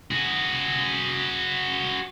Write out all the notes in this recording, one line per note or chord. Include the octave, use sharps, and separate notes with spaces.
F#4 G#4